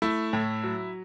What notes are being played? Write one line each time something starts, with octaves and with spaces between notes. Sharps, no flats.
A3 E4
A2
F#3